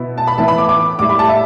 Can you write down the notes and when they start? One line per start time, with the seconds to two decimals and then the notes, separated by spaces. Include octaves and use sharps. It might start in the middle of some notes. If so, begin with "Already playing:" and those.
Already playing: B2 B3 E4
0.18 A5
0.27 B5
0.38 A2 E3 B3 E4 A5
0.48 B5
0.58 D6
0.69 D6
0.99 A2 G3 E4 D6
1.09 B5
1.19 A5
1.29 E5